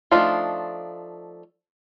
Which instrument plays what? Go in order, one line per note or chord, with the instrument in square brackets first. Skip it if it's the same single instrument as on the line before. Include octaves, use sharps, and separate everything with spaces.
[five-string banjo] F3 A3 D4 D#4 F4